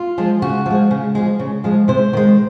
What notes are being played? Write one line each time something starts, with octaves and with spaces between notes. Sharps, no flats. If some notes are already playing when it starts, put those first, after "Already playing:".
Already playing: F4
F3 G#3
C#3 F#4
F3 G#3
C#3
F3 G#3
C#3
F3 G#3
C3 C5
D#3 G#3